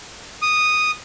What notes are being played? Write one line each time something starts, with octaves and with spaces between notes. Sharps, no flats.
D#6